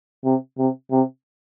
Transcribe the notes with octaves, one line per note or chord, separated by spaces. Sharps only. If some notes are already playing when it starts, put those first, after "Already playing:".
C3
C3
C3